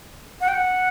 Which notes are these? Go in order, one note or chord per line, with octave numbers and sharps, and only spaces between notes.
F#5
G5
F#5